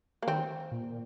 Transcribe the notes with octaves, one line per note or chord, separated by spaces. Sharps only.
A#3
D#3 C4
A#2